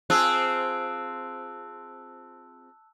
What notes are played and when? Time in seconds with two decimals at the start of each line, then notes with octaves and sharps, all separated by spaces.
0.10 C4 F4 G#4 A5 E6 F#6